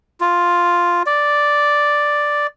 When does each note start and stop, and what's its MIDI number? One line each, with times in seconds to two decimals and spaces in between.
0.21 1.03 65
1.06 2.47 74